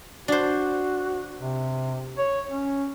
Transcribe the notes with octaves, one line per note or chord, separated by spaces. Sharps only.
D4 F#4 C5
C3
C#5
C#4